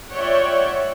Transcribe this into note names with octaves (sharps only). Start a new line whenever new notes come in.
F4 C#5 D5 E5 F#5 G5